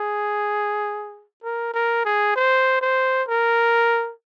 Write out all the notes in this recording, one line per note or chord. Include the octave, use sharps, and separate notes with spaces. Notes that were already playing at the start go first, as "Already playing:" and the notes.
Already playing: G#4
A#4
A#4
G#4
C5
C5
A#4